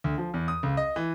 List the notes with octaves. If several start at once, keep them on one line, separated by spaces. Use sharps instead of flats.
D2
F3
E2
D#6
C#2
D#5
E3